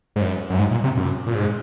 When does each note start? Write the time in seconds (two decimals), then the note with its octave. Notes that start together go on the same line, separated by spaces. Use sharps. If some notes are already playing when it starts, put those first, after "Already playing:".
0.16 G#2
0.21 F#2
0.50 F#2
0.59 G#2
0.71 A#2
0.84 C3
0.97 F#2
1.27 A#2
1.35 G#2